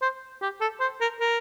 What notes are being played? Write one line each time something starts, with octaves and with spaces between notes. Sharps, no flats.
C5
G4
A4
C5
A#4
A#4